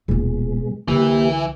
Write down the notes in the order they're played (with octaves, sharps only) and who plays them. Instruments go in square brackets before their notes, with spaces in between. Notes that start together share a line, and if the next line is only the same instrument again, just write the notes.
[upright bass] D#1 F4 [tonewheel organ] B2 G#3
[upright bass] C2 D3 [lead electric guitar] E3 [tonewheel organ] A#3 G4